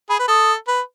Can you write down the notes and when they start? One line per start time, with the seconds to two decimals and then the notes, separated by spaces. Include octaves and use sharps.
0.09 G#4 B5
0.19 B4
0.28 A4 D#6
0.68 B4